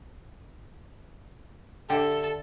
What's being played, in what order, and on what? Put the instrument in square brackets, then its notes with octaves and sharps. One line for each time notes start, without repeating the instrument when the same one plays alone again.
[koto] D3 [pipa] G4 E5 [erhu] A4